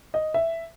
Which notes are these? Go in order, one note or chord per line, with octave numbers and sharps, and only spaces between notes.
D#5
E5